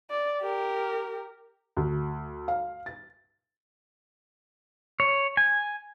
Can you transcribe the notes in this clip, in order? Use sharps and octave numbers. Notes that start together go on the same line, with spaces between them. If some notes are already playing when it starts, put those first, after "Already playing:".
D5
G4 A#4
D2
F5
A6
C#5
G#5